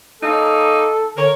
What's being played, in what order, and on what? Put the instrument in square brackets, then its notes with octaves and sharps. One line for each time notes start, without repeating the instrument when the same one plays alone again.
[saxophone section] A#3 C#4 D#4 [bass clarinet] A4
[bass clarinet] D3 [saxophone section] A#4 C#5